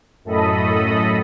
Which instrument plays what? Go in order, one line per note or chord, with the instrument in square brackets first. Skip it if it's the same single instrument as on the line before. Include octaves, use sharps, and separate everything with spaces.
[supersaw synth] F#2 A2 A4 D#5 B5 D#6